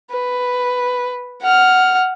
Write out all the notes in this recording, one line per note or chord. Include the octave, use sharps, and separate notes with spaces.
B4
F#5 F6